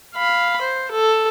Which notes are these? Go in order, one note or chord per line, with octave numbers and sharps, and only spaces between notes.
F5 B5
C5
A4